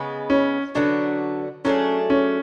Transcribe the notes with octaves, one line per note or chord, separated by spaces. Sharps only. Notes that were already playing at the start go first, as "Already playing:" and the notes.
Already playing: C#3 G#3 B3
C#4
D3 F#3 B3 D4 F#4
F#3 A3 C#4 D4 G#4
C#4